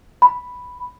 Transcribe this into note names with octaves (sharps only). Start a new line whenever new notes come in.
B5